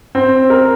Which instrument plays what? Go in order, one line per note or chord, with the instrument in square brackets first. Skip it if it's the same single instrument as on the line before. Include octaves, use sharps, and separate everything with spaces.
[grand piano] C4
A#4